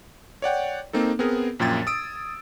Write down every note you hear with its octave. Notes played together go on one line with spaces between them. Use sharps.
C#5 D5 F#5 G5
A#3 C4 D#4 A4
B3 C4 G#4 A#4
A#1 F#2 A#2 G5 G#6 A6
D#6 E6 D7